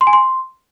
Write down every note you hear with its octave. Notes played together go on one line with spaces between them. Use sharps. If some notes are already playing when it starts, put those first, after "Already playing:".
C6
G#5
C6